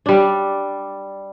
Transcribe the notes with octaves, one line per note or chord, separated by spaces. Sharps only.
G3 D4